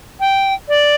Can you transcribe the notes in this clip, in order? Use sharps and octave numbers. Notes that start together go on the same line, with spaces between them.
G5
D5